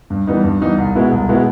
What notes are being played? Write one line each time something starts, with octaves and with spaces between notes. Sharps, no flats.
G2
E3 G3 B3 D#4
G2
E3 G3 B3 D#4
C2
B2 G#3 B3 E4
C2
B2 G#3 B3 E4